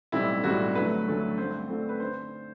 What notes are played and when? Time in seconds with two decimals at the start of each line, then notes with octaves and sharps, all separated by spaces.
0.12 B1 A2 G3 C4 E4
0.44 B1 A2 G3 C4 F#4
0.75 D2 D3 F#3 A3 B4
1.07 D2 D3 F#3 A3
1.37 G2 D3 A3 C4 C5
1.69 G2 D3 A3 C4
1.89 B4
2.00 D3 C5